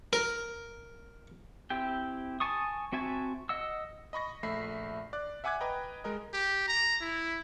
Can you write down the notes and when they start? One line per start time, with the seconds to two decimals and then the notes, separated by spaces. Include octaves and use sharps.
0.13 A#4
1.70 C4 E4 G4 G5
2.40 G#5 A5 C#6 D#6
2.92 C4 F#4 E5 G#5 A5
3.49 D#5 F#5 E6
4.13 D#5 B5 C#6 A#6
4.43 A#1 A3 E5 B5 B6 C7
5.13 D5 F#6
5.44 E5 F#5 G#5 D6 F#6 G#6
5.60 B4 D#5 G5 A#5
6.04 G#3 A#4 D#5
6.33 G4
6.68 A#5
7.01 E4